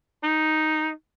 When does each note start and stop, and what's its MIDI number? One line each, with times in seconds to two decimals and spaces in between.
0.23 0.89 63